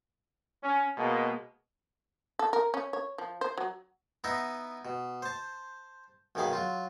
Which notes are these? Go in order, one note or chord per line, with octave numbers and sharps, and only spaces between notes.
C#4
B2 G#3 A#3
A4
A#4
C#4
C#5
F3
C5
F#3
B3 D#4 E4 D#5 E5 A#5
B2
C5 A5
B1 F#2 D#3 G#4 F5 B5
F#3 F4